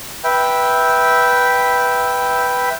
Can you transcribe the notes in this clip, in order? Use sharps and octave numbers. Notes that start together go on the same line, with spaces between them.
B4 E5 G5